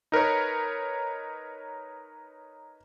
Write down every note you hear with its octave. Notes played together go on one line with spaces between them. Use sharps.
D#4 A#4 B4 C#5